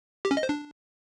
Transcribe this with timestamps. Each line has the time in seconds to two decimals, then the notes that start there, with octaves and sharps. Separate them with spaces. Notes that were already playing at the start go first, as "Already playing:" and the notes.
0.25 G4
0.31 C#4
0.37 D#5
0.43 C5
0.49 D4